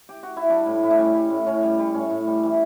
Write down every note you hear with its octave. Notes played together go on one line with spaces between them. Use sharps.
G4
F#4
E4
G3 D4
A2
A2 E4
D4
G3 C#4
G3
A2
A2 C#4
G3
G3
A2 C#4
A2
G3
E3